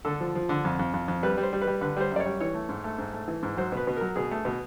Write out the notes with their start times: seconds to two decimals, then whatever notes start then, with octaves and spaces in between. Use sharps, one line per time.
0.05 D3 A4
0.21 F3
0.35 F3
0.49 D3
0.64 F2
0.79 F2
0.94 F2
1.08 F2
1.23 G3 B4
1.37 G3
1.43 C5
1.53 G3
1.62 B4
1.67 G3
1.81 D3 B4
1.97 G3 C5
2.11 F#2 D5
2.20 C#5
2.26 G3
2.40 E3 C#5
2.54 A3
2.69 G#2
2.84 A3
2.99 G#2
3.13 A3
3.28 E3
3.43 G#2
3.57 F#3 C5
3.72 B2 B4
3.87 B2
3.97 F#3 A#4
4.16 B2 G#4
4.31 A3
4.45 B2